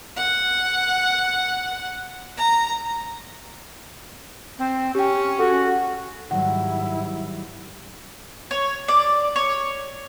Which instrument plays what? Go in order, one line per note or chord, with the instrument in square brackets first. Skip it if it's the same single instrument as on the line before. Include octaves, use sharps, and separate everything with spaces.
[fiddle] F#5
A#5
[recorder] C4
[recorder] C#4 [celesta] G4 G5
[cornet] F#4 [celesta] A4
[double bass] G#2 E4 [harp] D#3 F#3 G3 [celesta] F#5
[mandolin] C#5
D5
C#5